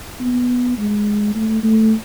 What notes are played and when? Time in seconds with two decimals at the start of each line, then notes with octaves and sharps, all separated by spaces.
0.20 B3
0.78 G#3
1.35 A3
1.64 A3